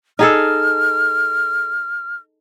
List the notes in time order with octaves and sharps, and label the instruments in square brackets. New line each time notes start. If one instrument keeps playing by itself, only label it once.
[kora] D#4 G#4 A4 [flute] F6